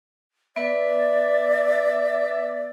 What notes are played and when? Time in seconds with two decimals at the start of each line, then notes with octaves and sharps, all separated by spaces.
0.56 B3 B4 D5 E5